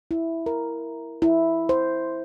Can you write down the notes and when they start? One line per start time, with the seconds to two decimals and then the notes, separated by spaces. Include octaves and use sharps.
0.11 E4
0.46 A#4
1.22 E4
1.69 C5